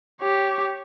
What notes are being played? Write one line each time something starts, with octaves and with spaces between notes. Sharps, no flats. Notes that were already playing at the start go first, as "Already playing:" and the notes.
G4 C#5